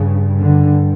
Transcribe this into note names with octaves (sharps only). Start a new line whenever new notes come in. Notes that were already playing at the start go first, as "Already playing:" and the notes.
Already playing: G2 C#3
D3